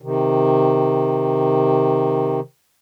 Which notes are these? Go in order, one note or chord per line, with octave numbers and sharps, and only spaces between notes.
C3 D#3